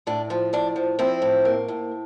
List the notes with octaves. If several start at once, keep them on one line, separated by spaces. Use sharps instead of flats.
A2 D4
F3
A2 D4
F3
F3 C4 E4
A2
A#3
A2